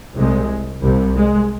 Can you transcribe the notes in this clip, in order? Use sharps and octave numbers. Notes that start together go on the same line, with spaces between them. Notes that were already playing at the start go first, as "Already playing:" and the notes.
C2 C3 G#3
C2 C3
G#3